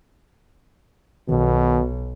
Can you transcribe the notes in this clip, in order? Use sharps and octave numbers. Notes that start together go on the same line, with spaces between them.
B1 B2 D#3